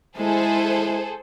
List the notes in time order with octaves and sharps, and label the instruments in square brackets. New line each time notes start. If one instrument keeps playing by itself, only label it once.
[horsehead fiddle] G#3 E4 [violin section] G#4 A4 C5